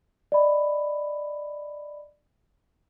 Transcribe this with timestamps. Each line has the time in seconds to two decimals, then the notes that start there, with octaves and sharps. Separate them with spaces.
0.32 D5 D#5 B5